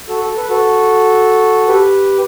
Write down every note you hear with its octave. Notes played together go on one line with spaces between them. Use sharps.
F#4 A4
A4
B4
F#4 A4
G4 B4